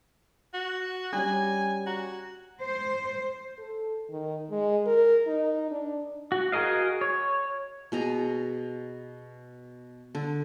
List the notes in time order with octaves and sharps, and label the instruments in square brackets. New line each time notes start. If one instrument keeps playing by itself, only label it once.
[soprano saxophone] F#4
[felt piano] G3 C#4 [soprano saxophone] G#5
[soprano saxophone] F#4 [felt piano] A#5
[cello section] C5
[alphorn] A4
D#3
G#3
A#4
D#4
D4
[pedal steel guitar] F#4
F#4 G#4 A#4 D#5 F5
C#5
[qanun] B2 G#4 A#5
D3